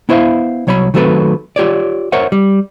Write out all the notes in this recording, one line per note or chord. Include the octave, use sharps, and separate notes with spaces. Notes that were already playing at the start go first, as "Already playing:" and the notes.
B3 E4 C5 D5 E5 F5
C2 F#3 C#5 D5 B5
D#3 F#3 A3 C4 A4 B4
F4 G4 C#5 D5
A#4 C5 C#5 E5 F#5
G3